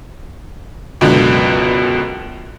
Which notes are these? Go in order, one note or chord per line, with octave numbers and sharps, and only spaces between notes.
C#2 F#2 B2 D3